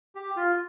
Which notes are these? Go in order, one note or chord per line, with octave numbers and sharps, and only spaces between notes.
G4
F4